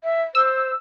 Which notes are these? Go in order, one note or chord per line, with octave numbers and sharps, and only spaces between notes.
E5
C5 E6